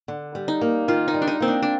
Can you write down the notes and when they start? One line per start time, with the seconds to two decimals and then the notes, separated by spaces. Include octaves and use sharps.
0.08 D3
0.35 G3
0.48 D#4
0.61 A#3
0.88 D#3 F4
1.08 D#4
1.14 G3
1.22 D4
1.27 D#4
1.40 A#3 C4
1.48 D4
1.63 D4